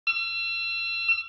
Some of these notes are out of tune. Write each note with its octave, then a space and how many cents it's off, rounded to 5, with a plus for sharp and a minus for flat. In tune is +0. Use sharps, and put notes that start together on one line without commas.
E6 +45